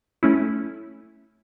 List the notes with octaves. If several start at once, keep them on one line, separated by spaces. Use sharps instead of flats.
A3 C#4 E4